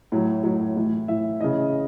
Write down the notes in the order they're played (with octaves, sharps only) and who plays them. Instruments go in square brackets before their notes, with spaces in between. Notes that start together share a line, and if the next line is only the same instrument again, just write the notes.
[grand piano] A2 F#3
A2 F#3
A2 E3
A2 E3 E5
C#3 E3 D#5